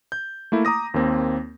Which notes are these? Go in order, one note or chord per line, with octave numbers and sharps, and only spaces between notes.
G6
A3 A#3 E4
A#5 D6 D#6 A#6
D#2 A#3 C4